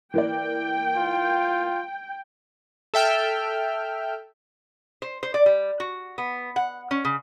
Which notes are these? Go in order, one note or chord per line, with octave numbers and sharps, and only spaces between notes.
E3 A#3 D5 G5
F4
A4 E5 G5 F6
C5
C5
D5
G3
F#4
B3
F#5
C#4
C#3